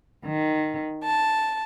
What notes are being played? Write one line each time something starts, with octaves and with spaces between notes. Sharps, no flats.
D#3
A5